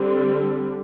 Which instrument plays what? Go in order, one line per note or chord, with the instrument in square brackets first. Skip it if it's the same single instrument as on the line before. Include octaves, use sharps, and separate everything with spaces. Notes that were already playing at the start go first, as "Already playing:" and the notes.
Already playing: [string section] D3 G3 C4